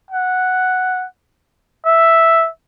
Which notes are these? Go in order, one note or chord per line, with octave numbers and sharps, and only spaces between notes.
F#5
E5